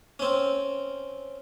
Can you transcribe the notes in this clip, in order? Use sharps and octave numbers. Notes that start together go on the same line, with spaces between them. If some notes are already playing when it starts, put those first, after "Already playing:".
C4 C#4